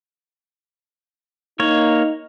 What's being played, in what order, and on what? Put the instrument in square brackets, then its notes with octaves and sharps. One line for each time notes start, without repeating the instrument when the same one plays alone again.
[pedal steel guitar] A#3 C#5 [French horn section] D#4